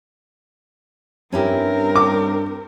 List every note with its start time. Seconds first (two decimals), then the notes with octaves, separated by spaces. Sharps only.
1.32 G2 C4 C#4 E4 G4 A#4
1.96 D6